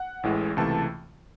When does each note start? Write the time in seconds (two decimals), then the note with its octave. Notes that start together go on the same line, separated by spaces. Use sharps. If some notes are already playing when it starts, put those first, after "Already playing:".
Already playing: F#5
0.23 A1 A2 E3 G#3
0.57 C#2 C3 E3 A3 A5